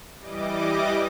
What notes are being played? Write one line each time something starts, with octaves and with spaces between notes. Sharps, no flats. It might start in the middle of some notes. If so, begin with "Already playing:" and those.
E3 G3 D#5 D6